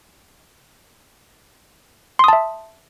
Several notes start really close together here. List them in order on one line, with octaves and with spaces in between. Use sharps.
C6 D#6 A5 E5